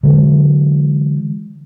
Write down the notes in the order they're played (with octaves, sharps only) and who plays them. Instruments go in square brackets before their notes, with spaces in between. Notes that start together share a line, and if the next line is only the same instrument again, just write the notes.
[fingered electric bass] D3 E3 F#3 G#3